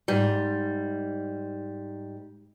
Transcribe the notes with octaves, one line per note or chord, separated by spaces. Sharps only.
G#2 G3